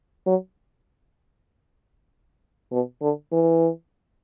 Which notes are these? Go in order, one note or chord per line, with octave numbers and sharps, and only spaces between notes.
F#3
B2
D3
E3